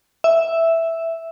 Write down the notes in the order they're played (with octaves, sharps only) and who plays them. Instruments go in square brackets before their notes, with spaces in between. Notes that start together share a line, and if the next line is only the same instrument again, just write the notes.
[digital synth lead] E5